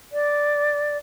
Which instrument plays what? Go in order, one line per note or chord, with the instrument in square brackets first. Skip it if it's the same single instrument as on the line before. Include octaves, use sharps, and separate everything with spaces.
[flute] D5